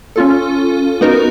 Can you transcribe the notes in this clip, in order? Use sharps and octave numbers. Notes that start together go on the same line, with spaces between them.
C#4 F4 A4
B3 D#4 F#4 A#4